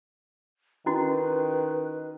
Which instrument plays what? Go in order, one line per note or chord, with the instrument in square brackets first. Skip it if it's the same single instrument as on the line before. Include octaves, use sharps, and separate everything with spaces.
[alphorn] D#3 [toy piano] C#4 E4 F#4 [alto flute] B4